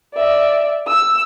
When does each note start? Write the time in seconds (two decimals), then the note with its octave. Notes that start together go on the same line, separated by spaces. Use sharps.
0.14 D5 E5
0.87 E6